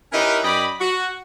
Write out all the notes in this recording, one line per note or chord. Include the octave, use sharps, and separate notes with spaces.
C#4 D#4 E4 G4 A#4 B4
F#2 D5 D#5 G5 B5
F#4